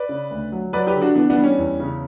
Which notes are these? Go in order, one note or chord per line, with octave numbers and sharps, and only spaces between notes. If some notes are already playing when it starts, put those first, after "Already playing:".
Already playing: B4 D5
C#3
D2
F#3
F#3 B4 D5
G4 B4
D3
D4 F#4
E3 B3 D4
B3 D4
G3
C#4
E2
C#3